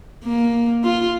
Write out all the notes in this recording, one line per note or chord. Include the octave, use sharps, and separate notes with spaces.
A#3
F4